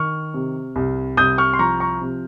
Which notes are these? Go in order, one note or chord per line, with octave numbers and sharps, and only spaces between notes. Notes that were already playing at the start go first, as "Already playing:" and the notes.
Already playing: D#3 C#6 F6
C3
C2
C2 D#6 G6
C#6 F6
C6
F3 A#5 C#6
A#5 C#6
C3